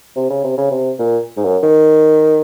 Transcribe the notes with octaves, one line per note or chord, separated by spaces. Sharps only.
C3
C#3
C3
C#3
C3
A#2
G#2
F#2
D#3